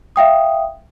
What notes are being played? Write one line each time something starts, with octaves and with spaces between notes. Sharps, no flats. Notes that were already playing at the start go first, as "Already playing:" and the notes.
E5 F5 G5 D#6